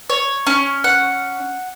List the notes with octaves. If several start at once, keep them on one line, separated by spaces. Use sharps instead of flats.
C#5
C#4
F#5